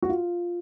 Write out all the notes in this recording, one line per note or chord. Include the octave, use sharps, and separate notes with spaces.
F#4
F4